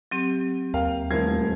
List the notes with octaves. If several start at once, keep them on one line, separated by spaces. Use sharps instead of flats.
F#3 C4 G4
D#2 A#4 F5 G5
D#1 E2 F3 A3 E4 A#4 G#6